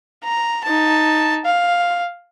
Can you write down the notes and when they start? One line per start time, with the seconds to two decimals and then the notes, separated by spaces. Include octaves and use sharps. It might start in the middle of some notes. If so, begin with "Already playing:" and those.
0.24 A#5
0.64 D#4 A5
1.45 F5